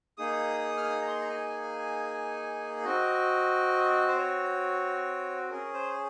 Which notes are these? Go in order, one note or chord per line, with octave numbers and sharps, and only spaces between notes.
A#3 D#4 G#4 D#6
F6
D#6
A#5
C6
A#5
G#5
C4 F#4 D#5
C5
C#5
C#4 G#4 A#4
C5